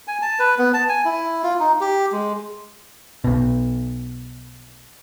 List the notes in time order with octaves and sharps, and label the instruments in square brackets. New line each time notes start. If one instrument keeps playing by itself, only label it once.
[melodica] G#5
A5
B4
B3
A5
G#5
E4
F4
D#4
G4
G#3
[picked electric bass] B1 B2